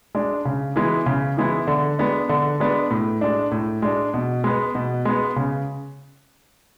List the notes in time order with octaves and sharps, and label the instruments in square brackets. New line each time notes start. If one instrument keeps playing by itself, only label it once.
[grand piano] G#3 D4
C#3
E3 G#3 B3 E4
C#3
E3 G#3 B3 E4
D3
G#3 B3 D4
D3
G#3 B3 D4
A2
G#3 D4
A2
G#3 D4
B2
G#3 B3
B2
G#3 B3
C#3